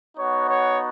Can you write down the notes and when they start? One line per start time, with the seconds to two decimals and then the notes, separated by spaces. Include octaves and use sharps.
0.16 B3 D#4 F#4 C#5
0.47 C#5